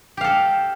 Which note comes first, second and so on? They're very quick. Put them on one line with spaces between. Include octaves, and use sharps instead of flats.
G4 F5 A4